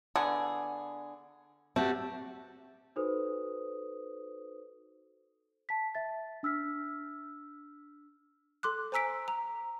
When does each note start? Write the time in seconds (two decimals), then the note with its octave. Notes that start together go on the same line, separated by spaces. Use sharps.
0.16 D3 B3 G#4
1.76 A3 C4 F#4 G4
2.96 D#4 F#4 A4 B4 C5 D#6
5.69 A5 B6
5.95 E5 A6
6.43 D4 E6 F6 B6
8.63 A4 C6 D6 F#6
8.92 C5 G#5 A#5 E6 B6 D7
9.28 A#5